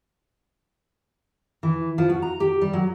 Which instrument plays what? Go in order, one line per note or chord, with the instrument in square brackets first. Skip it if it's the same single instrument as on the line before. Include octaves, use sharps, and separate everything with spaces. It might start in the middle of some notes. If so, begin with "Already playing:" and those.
[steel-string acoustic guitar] E3
F3
F#4
A#5
G4
G3
F#3